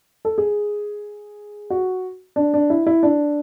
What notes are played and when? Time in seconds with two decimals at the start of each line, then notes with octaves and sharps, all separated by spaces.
0.25 A4
0.38 G#4
1.70 F#4
2.36 D4
2.54 D4
2.70 E4
2.86 E4
3.03 D4